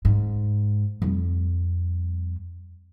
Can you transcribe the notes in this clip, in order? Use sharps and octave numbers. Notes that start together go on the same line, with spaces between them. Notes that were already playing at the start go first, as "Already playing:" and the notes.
G#2
F2 G3